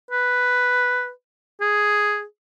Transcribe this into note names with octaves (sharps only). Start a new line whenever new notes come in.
B4
G#4